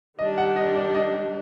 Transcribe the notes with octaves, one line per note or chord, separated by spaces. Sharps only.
D#3 G3 D4 G4 D#5
F#5
D#5
D5
D#5